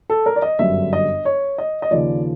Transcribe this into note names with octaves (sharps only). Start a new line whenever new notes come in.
A4
A#4
D5
D#5
G1 F#2 D3 G3 E5
D#5
C#5
D#5
D#5
D#2 C#3 F3 D5